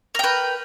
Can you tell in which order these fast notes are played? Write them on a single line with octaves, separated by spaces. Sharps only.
A#4 G5 B4